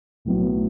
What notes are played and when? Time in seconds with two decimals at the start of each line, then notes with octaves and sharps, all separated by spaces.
0.25 B1 A2 F#3 B3